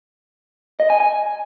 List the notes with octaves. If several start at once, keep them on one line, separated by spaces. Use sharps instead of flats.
D#5
G#5
G#5